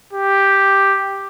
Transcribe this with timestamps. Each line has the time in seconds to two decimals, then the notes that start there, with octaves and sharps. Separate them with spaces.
0.13 G4